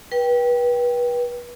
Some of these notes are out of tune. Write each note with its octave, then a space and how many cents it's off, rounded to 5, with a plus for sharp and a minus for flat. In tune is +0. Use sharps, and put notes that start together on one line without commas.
B4 -30 G5 +0